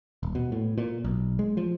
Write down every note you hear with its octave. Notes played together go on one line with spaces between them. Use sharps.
D#1
B2
A2
A#2
B1
G#3
F3